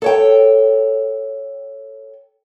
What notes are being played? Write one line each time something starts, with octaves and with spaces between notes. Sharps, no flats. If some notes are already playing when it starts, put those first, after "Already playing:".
A4 C#5 G5